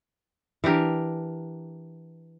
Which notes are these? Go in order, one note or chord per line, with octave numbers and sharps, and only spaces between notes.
E3 D4 G4 A#4